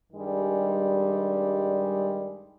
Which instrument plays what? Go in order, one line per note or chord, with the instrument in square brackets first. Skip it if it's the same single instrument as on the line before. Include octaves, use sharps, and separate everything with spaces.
[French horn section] G2 D#3 G3 G#3